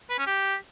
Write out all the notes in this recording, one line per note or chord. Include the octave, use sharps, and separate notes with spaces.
B4
C#4
G4